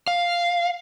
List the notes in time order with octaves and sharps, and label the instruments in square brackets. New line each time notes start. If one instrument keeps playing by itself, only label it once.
[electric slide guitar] F5